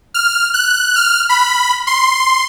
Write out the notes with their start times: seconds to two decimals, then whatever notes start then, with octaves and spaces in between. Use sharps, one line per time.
0.14 F6
0.54 F#6
0.96 F6
1.29 B5
1.87 C6